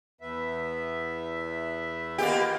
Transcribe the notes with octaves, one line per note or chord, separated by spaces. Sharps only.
E2 B3 E5
A#3 B3 F4 G4 D#5